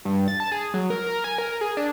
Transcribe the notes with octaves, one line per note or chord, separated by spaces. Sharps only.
G2
A6
A5
G#4
F#3
A#4
A#4
G#5
A#4
G#4
D4